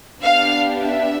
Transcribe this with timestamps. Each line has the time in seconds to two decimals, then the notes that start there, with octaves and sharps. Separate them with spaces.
0.22 B3 D4 G4 F5
0.82 E5